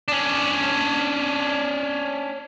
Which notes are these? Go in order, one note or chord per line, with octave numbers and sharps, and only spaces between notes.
C#4 D4